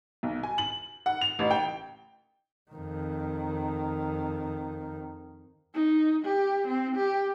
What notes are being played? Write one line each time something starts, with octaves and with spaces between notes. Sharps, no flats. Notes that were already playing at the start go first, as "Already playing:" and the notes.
B1
G#5
F#7
F#5
F7
A1
G5
F2 D#3
D#4
G4
C4
G4